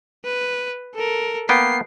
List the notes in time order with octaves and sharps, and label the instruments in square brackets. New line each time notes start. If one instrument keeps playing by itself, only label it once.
[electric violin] B4
A4 A#4
[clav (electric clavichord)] A#3 B3 G5 [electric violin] C7